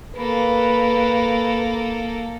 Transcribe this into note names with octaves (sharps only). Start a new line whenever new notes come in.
A#3 A4 B4